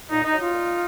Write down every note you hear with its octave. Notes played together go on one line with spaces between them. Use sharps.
A#2 D#4
D#4
F#3
D#4 F4
A#2